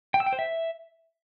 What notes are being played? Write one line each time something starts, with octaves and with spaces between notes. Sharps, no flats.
G5
E6
G5
C5
E5